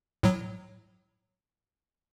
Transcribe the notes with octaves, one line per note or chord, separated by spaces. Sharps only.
A2 F#3